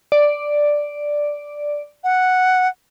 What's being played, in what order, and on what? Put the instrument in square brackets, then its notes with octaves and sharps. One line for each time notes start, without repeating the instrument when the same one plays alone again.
[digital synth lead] D5
[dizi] F#5